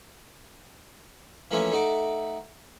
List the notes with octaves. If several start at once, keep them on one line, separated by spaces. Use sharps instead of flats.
E3 F3 A3 A#3 C#4 E5
A3 D#4 F#4 D6